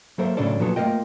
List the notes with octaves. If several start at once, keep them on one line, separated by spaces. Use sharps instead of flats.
F#3 A#3 A4 A#4 C5 E5
A2 C#3 F#3 C#4 D4 A4
F#2 A#2 F3 F#3 B3 A4
A3 A#3 F4 A#4 D#5 G5